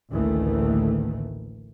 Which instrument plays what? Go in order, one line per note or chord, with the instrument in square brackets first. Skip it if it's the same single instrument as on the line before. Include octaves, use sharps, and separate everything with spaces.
[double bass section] A1 D2 D#3 E3 A3 A#3